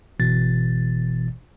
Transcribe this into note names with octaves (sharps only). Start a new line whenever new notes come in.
G1 B2 E3 A6